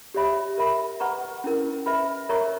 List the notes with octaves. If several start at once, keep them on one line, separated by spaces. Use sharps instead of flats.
G4 C#5 E5 B5
A#4 E5 B5
B4 F#5 A#5 C#6
C#4 E4 A#4
B4 E5 B5
A#4 C#5 E5 A#5 C#6